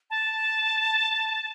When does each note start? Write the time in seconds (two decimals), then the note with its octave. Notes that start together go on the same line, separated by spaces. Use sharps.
0.10 A5